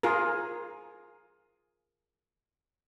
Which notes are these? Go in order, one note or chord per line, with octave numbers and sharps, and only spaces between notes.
F4 G#4 A#4